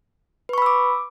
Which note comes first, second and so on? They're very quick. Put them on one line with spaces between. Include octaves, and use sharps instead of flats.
B4 C#6 B5 E6 D6